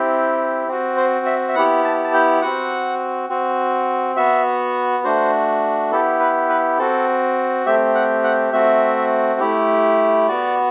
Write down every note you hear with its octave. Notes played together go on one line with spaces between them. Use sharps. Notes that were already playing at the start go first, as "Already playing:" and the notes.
Already playing: C4 E4 G4
C4 F#4
C5
E5
E5
B3 E4 G4 F#5
A5
A5
G5
C4 F#4 F#5
C4 F#4
B3 F#4 E5
A3 D4 F#4 C5
B3 E4 G4 A4
B4
B4
C4 F#4 A4
A3 C4 G4 E5
F#5
F#5
A3 C4 F#4 E5
A3 E4 G4
B3 F#4 D5